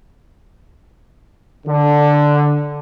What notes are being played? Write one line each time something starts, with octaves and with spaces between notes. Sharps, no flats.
D3